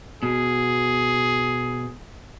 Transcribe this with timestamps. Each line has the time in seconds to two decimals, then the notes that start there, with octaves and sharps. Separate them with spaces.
0.23 B2 G#4